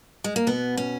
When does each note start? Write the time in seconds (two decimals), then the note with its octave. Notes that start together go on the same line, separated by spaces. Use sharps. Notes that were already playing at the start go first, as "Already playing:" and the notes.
0.24 G#3
0.36 A#3
0.47 B2 B3
0.77 C#4